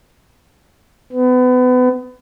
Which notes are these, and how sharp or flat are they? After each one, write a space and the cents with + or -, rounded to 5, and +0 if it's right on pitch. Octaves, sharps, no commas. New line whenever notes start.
B3 +30